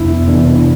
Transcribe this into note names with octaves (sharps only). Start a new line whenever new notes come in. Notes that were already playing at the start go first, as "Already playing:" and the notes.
Already playing: F2 C3 B3 D4 E4
C3 E3 B3 D4